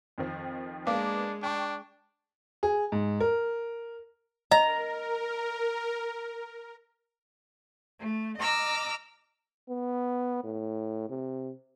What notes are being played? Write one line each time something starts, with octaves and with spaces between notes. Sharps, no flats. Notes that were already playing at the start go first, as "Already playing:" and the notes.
F2 D#3 F3
G#3 A#3 B3 D4 F5 D6
D4 G5 C#6
G#4
G#2
A#4
A#4 D#5 A#5
A3
D#5 A#5 D6 E6 F6
B3
A2
C3